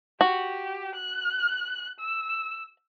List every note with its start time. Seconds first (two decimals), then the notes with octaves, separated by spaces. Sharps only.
0.21 F#4 G4
0.95 F#6
2.00 E6